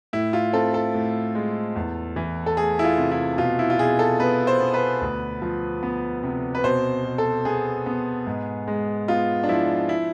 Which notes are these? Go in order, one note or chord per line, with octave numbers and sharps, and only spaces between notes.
A2 E4
F4
C4 A4
A4
A2
G#3
E2
E3
A4
A3 G#4
E4
F4
C3
E4
B2 F4
E4
F4
B2 G#4
A4
B3 B4
C5
B3
B4
D2
F3
B3
C3
B4
B2 C5
B2
A4
B3 G#4
B3
G#2
G#3
B3 F4
D4
F3 E4
E4